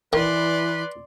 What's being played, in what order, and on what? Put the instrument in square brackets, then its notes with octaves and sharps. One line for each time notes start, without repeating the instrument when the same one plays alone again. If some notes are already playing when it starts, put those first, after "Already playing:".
[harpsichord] D#3 [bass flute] E3 [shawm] B4 [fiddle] D5 C6